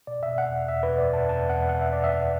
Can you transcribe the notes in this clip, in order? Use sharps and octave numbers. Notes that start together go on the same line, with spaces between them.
B2 D5
E5
B2
F#5
E2
E2 E5
B4
B2
D5
B2 A5
E2 A5
E2 F#5
B2 F#5
E5
B2 D5
E5
E2